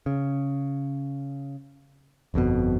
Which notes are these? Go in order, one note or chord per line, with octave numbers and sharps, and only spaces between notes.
C#3
G1 F2 G#2 B2